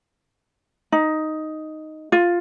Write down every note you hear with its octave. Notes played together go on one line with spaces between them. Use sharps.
D#4
F4